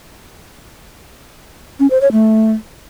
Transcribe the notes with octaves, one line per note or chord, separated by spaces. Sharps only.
C#4
C5
C#5
A3